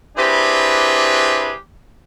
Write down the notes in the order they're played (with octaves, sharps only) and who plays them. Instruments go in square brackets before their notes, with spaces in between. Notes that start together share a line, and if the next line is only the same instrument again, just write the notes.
[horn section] C4 D4 E4 G4 G#4 B4